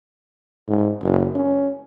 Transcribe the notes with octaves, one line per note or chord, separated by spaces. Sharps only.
G#2
F#1
C#4